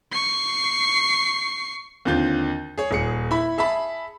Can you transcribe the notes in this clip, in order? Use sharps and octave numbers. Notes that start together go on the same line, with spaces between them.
C#6 C7
D#2 D3 C4 F4 G6
G#4 C#5
D#1 G#4 C#7
E4 B5
G#4 E5 A5 B5